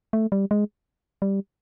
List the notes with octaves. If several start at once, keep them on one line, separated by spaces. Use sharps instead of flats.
A3
G3
G#3
G3